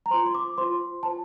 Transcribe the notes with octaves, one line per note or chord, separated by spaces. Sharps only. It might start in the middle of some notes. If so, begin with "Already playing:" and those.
A#5
F4 C5 C6
C6
D6
F4 C5 C6
F4 C5 A5